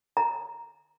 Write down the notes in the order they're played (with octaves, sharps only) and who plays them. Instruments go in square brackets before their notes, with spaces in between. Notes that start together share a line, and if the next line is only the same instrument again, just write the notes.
[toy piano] A#5